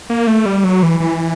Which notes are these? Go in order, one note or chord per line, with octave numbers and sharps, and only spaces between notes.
A#3
A3
G3
F#3
E3
E3